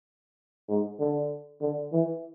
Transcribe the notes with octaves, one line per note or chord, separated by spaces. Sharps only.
G#2
D3
D3
E3